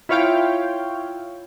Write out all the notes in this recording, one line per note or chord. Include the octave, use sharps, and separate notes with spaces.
E4 F4 C#5 F5 G5